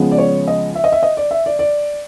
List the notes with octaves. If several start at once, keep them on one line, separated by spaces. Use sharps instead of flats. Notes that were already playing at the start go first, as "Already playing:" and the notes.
Already playing: C#3 F3 G#3 B3
D5
C#5
D#5
E5
D#5
E5
D#5
D5
E5
D5
D5